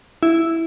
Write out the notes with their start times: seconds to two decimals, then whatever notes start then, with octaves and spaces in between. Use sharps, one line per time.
0.23 E4